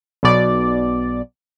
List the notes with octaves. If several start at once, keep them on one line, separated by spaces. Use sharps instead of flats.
B1 B2 D5